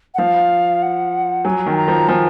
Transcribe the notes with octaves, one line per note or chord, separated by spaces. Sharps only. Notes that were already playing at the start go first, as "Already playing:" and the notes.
F#5
F3 F5
F#5
F#3 G#5
D#3
G#5
A#5
F3
F3 G#5